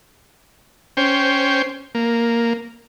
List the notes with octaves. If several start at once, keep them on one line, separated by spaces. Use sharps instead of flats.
C#4 C5 G5
A#3